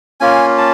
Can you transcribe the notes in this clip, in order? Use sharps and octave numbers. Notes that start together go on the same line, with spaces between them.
A#3 C#4 F4 G#5
A5